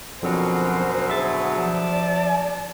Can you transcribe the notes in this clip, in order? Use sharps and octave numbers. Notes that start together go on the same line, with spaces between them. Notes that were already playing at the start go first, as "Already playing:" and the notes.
F2 B2 D3 F#3 C#4 A#4 C5
G#4 E5 A6
F3 D5 A5